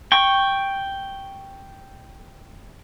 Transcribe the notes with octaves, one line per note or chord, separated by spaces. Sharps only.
G5 C#6